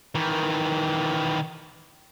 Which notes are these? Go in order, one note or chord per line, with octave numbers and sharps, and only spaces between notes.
D#3 E3